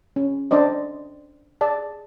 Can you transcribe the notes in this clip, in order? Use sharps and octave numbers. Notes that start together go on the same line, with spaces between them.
C#4
D4 C5 D5 D#5
G#4 D5 A5